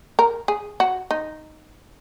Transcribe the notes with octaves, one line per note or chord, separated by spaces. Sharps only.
A#4
G#4
F#4
D#4